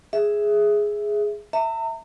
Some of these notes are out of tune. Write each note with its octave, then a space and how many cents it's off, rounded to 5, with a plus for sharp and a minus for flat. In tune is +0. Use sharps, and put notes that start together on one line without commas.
G#4 +0 E5 +0
E5 -5 A#5 -40